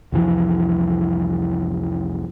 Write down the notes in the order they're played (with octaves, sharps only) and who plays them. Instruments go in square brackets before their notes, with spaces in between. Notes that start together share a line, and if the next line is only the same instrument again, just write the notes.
[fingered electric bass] C2 F2 E3 F3